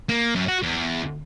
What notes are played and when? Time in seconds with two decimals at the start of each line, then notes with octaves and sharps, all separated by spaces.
0.09 A#3
0.35 F#2
0.48 F#4
0.63 E2